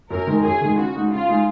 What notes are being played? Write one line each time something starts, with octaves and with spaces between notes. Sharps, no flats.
F#2 A#4
D#3 G#3
F#2 G#4
D#3 G#3
C#3 F#4
G#3 D#4 G#4
C#3 F4
G#3 D#4 G#4